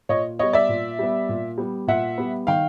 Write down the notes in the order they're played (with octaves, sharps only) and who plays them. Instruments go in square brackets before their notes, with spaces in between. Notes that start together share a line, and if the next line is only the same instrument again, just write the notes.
[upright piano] A#2 C#5 D#5
G3 B3 C#5 D#5
D5 E5
A#2
G3 B3
A#2
G3 B3
A#2 E5 F#5
G3 B3
D#3 F5 G5